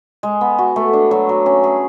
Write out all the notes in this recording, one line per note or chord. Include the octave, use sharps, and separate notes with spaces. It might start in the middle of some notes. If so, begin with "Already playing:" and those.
G#3
B3
F#4
A3
D4
F#3
F#3
C#4
G#4